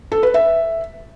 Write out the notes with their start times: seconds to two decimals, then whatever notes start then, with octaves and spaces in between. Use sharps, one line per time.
0.12 A4
0.23 B4
0.34 E5